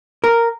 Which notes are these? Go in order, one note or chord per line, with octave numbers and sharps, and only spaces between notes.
A#4